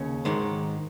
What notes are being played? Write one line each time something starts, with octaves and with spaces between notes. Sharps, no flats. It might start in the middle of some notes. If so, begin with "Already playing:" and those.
Already playing: D#2 C#3 C#4
G#2 D#3 G#3